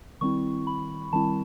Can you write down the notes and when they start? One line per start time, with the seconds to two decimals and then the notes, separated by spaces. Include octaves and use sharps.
0.21 D#3 G3 C4 E4 C#6
0.67 B5
1.13 D#3 G3 C4 E4 A5